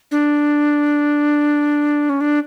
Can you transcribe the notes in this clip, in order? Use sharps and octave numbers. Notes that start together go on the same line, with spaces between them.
D4
C#4
D4